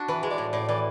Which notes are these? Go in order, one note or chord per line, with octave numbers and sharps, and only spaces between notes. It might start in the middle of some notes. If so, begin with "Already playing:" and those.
Already playing: D4 F#4
E3 B4
G#3
D5
A2
A2 D5
E3 D5